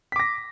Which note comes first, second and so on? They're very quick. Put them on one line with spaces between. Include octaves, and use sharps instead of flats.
B6 D6 A#6